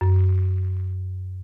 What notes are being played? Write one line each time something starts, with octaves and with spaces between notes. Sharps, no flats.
F#2